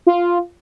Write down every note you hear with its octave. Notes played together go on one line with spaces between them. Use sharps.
F4